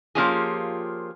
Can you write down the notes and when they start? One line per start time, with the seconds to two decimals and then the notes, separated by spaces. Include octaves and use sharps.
0.15 F3 A#3 C#4 F4 G4 G#4